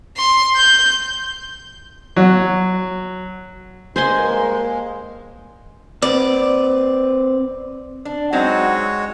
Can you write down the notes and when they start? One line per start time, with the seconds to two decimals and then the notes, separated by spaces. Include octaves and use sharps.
0.17 C6
0.56 G6
2.16 F#3
3.96 G2 G#3 A#3 C5 G#5 C6
6.02 C4 B4 D5
8.05 D4
8.33 F#3 G#3 C4 D#4 F#4 C#5